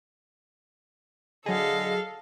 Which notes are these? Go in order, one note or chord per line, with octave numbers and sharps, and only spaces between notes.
D3 F#3 G#4 A4 D#5 F5